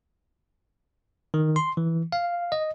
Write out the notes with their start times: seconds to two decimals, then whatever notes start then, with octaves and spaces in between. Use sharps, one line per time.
1.34 D#3
1.56 C6
1.77 E3
2.12 F5
2.52 D#5